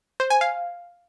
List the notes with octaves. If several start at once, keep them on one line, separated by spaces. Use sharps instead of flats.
C5
G#5
F5